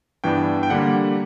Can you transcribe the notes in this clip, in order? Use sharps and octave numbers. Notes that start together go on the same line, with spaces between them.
G2 E3 B3 D4 G5
G5
D3 G3 A#3 F#5